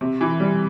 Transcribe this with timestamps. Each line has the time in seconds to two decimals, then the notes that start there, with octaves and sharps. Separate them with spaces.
0.01 C3
0.21 E3
0.40 G3